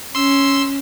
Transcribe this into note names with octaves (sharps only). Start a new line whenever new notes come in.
C#4 C6 E6